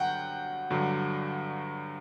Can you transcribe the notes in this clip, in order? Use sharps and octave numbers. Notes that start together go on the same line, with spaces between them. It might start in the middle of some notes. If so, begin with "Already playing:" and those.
Already playing: G2 D3 F#3 F#5 G5
G2 D3 F#3